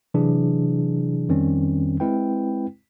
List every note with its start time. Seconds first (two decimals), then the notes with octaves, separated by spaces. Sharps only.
0.14 C3 E3 F#3 D4 E4 G#4
1.29 F2 D#3 G3 C4 C#4
2.00 G#3 C4 E4 B4 G5